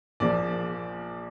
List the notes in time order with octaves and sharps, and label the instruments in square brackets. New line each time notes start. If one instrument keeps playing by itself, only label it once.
[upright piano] A#1 A#2 F3 D5